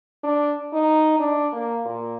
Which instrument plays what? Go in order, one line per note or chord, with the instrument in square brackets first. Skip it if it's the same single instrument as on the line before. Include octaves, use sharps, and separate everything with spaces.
[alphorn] D4
D#4
D4
A#3
A#2